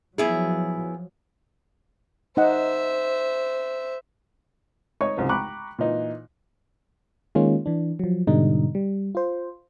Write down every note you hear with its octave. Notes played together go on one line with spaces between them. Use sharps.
F3 F#3 B3 E4 G#4
D#4 C5 D#5 E5 F#5
D#4 C#5 D#5 C#6
C2 G#2 C#3 F3
G5 A#5 B5 C#6 D6 F#6
A#2 E3 D#4
D#3 G#3 A#3 C#4 F4
E3 D4
F3 F#3
G#2 B2 D3 G3 D#4
G3
F4 C5